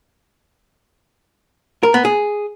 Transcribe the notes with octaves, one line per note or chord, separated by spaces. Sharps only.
A#4
B3
G#4